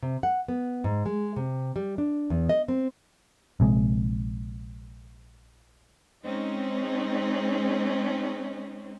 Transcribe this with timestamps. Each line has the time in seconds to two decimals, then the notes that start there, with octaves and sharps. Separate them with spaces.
0.03 C3
0.23 F#5
0.48 B3
0.84 G#2
1.06 G#3
1.36 C3
1.76 G3
1.98 D4
2.30 E2
2.49 D#5
2.68 C4
3.60 A#1 C3 G#3
6.24 G#3 C4 C#4 D#4